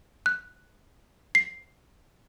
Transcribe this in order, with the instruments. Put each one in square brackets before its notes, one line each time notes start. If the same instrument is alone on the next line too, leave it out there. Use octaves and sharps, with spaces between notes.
[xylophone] F#6
C7